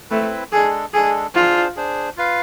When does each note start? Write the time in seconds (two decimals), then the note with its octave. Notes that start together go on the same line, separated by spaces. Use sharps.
0.10 A3 C4 E4 B4
0.52 G#3 D4 G#4 A4
0.93 G#3 D4 G#4 A4
1.35 D4 F4 G#4 C5
1.76 D4 G#4 C5
2.17 F4 B4 F5